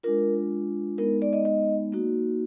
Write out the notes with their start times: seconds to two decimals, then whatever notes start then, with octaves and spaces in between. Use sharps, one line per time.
0.03 G#3 D4 F4 A#4
0.98 G#3 B3 D#4 A#4
1.22 D5
1.33 D#5
1.45 D#5
1.92 A#3 D#4 F#4